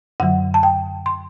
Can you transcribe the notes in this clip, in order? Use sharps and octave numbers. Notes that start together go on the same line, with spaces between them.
F#2 D3 F#3 F#5
A5
G5
C6